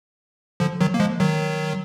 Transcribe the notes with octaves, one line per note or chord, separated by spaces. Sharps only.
D3 F3
D#3 F#3
A#3
F3 G#3
D#3 F#3